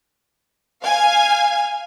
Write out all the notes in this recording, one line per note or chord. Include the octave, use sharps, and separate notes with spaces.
F5 G#5